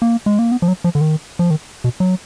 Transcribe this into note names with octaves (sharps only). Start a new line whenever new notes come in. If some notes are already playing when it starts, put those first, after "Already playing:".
A#3
G#3
A#3
B3
F3
F#3
F3
D3
D#3
F3
D#3
B2
F#3